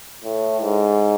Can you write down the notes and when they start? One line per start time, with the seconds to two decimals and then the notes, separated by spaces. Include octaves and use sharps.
0.24 A2
0.60 G#2